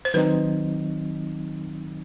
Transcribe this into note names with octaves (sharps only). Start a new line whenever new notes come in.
C5
D#3 F#3 C4 D#4 B4